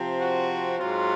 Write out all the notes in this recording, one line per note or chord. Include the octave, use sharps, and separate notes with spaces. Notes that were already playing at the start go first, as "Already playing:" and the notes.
Already playing: C3 F3 C4
F#4
G#2 F#3 C4 F4